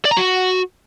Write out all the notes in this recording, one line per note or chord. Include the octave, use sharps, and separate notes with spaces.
D5
A#5
F#4